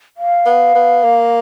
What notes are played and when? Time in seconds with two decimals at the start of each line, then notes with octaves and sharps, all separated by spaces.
0.17 F5
0.46 B3
0.75 B3
1.04 A#3